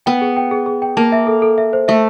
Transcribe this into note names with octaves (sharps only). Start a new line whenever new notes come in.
B3 G5
G#4
G5
G#4
G#4
G5
A#3 A5
E5
A4
A4
E5
C5
A3 E5